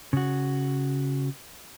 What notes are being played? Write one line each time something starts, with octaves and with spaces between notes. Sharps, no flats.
C#3 F#4